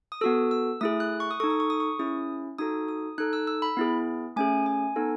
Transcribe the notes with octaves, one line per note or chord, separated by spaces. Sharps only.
D#6
B3 F#4 A4 E6
E6
A3 E4 G#4 D#6
F#6
C#6
D#6
D#4 A4 C#6
D#6
C#6
D#6
C#6
C#4 E4 G#4 D#6
D#4 F#4 A4 D#6
D#6
D#4 A4 F#6
E6
E6
B5
B3 E4 G#4
A3 C#4 G#4 G#5
G#5
B3 D#4 A4